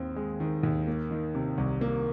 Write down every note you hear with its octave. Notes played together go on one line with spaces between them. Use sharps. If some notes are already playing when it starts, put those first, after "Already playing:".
Already playing: D#2 C4
G#3
D#3
D#2
A#3
D#3
C3
C2
A#3